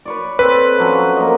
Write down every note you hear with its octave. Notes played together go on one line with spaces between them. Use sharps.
B4 C#5 D5
C4 A4 B4
F3 F#3 C#4
A#3 D#5